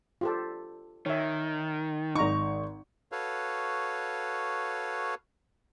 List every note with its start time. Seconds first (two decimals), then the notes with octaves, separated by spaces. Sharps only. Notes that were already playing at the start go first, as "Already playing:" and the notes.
0.21 F4 G4 A4
1.06 D#3 C#5 E5
2.15 G#1 D#4 A#5 C#6
3.12 F#4 A4 B4 C#5 F5